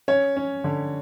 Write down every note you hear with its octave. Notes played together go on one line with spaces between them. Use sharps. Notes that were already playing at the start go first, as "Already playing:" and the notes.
C#4 C#5
C#4
D3